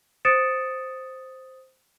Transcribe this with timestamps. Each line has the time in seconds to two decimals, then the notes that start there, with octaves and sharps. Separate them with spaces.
0.25 C5 D#6 A6 C#7 D7 E7